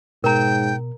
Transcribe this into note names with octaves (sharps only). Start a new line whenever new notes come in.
G#2 B2 A#4 G5 A#5